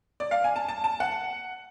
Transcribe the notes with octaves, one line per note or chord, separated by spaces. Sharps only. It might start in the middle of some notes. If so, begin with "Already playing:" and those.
D5
F5
G#5
A5
A5
A5
F#5